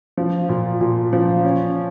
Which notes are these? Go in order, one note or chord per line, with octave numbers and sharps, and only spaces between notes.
F3
A#2
A#2
F3
C#4